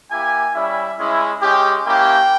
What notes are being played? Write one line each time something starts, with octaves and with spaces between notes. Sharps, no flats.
A#3 E4 G4 G#5
G3 C#4 E4 E5
G#3 C#4 E4
G#3 C#4 G4
A#3 C#4 E4 G4 G5